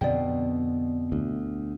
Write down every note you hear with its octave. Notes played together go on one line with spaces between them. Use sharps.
F2 B2 D3 C4 D5 G5
D2